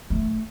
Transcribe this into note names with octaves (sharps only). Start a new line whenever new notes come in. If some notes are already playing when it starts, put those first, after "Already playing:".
A3